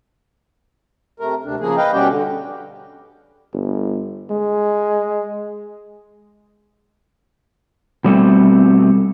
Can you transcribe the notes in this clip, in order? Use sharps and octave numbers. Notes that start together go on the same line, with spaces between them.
C3 A3 A#4
D2 C3 D4
C#3 F3 A#3 G#4
B4 D#5 F5 G5
B2 G3 C#4 F#4 G4 G5
D3
G1
G#3
B2 G3 A3 C4